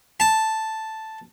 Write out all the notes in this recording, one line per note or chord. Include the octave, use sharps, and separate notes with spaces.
A5